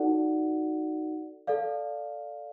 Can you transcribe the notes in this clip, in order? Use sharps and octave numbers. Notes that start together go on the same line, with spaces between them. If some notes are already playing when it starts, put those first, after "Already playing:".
Already playing: D#4 F#4 A4 D5 F#5
A4 D5 F5